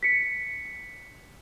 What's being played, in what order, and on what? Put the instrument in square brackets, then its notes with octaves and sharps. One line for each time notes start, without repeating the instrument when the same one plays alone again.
[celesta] B6 C#7